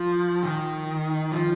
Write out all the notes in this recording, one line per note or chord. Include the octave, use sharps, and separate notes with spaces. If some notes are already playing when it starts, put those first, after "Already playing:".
Already playing: F3
D#3
F3